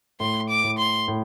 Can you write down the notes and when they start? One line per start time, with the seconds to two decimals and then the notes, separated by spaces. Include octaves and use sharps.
0.20 A2 C6
0.50 D6
0.64 A2
0.78 C6
1.08 A2